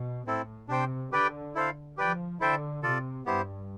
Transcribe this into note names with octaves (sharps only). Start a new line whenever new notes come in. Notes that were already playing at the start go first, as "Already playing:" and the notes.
Already playing: B2
A2 C4 E4 A4
C3 D4 G4 C5 G5
D3 G4 B4 D5 G5
E4 A4 C5 F5
F3 G4 B4 D5 G5
D3 E4 A4 C5 E5 G5
C3 F4 A4 D5
G2 B3 E4 G4 C5